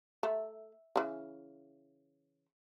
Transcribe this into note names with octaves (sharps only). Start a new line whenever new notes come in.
A3
C#3 E3